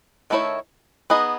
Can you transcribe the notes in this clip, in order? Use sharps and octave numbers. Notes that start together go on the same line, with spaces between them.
D#3 A3 E4 A4 C#5
B3 D#4 G#4 B4 D#5